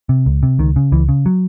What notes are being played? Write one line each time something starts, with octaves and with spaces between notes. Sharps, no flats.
C3
C#2
C3
C#2 D#3
C#3
C#2 E3
C#3
F#3